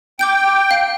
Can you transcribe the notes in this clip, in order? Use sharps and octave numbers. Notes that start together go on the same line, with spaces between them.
G5 D6 G6 D7
F5